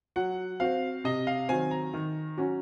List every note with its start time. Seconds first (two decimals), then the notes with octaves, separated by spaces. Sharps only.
0.16 F#3 F#5
0.60 C4 F#4 C5 F5
1.04 C3 D#5
1.27 F5
1.49 D#3 F#3 C4 G#5
1.71 A#5
1.94 D#3
2.37 F#3 C#4 F#4